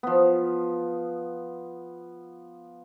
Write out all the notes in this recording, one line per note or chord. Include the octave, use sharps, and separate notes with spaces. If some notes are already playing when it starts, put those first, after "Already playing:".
F3 B3